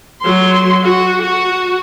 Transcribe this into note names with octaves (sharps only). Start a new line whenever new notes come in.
F#3 C6
F#4
F#4